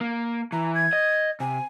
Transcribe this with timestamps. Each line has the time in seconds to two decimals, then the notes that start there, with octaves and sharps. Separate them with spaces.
0.01 A#3
0.52 E3 A#5
0.75 G#6
0.93 D#5
1.40 C3 G#5